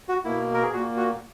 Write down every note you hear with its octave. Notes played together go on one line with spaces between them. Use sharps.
F#4
B2 A#3 E4
A#4
G#4
A#2 A#3 F#4
F#4